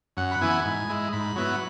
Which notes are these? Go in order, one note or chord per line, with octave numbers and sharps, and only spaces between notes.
F#2 F#5
B5
E3 B3 E4 G#5
G#2
G#3 E4
G#2 B5
F#3 B3 E4